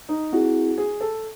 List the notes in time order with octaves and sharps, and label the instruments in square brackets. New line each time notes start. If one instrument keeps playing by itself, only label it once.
[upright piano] D#4
[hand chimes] C4 E4 G#4 [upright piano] F#4
[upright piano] G#4
A4